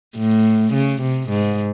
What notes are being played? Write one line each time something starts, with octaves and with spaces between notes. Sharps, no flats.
A2
C#3
C3
G#2